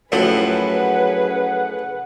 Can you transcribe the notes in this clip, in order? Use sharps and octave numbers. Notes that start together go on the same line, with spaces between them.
F#2 A2 F3 F#3 C#4 G#4 B4 F#5